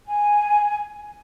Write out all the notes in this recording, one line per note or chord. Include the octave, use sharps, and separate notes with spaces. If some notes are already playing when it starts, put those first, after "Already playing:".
G#5